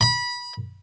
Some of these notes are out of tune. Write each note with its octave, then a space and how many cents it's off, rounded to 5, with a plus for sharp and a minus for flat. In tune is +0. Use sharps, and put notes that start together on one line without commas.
B5 -20